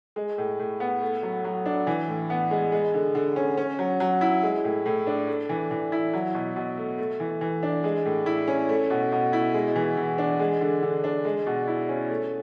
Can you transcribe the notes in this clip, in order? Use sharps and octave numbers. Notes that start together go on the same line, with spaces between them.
G#3
A2
A2
B3
A3
F#3
F#3
D4
E3
A2
B3
G#3
G#3
D3
D3
C#4
C#4
F#3
F#3
E4
G#3
A2
A2
D4
A3
E3
E3
E4
F#3
B2
B2
A3
A3
E3
E3
D4
G#3
A2
E4
C#4
A3
B2
B2
E4
G#3
E3
E3
D4
G#3
D3
D3
D4
G#3
B2
E4
C#4
A3